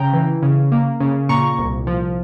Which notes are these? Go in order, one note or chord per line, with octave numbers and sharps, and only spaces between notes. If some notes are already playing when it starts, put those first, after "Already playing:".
Already playing: C#3 G5 A#5
E3
C#3
A#3
C#3
A#2 A#5 C#6
C2
F3